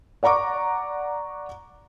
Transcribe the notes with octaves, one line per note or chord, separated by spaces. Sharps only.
D5 F#5 A#5 C#6 D6